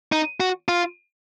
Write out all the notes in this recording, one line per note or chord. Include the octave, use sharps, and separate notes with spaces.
D#4
F#4
F4